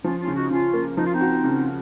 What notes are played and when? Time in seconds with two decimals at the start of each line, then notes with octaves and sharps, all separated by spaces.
0.04 F3 C#4 F4
0.20 C#4 F4
0.28 C#3
0.35 D#4 F#4
0.51 C#3 C#4 F4
0.74 A#3
0.97 F3 D#4
1.05 F4
1.13 C4 D#4
1.21 F#4
1.44 C#3